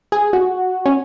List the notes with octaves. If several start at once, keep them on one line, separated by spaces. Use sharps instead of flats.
G#4
F#4
C#4